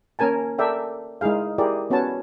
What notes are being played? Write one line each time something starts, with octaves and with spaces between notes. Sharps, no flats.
A#3 C#4 A#4 G#5 A5
A4 A#4 D5 E5 G5
G#3 D#4 E4 G#4 F5
E4 G4 G#4 A#4 D5
B3 C#4 F#4 B4 C#5 A5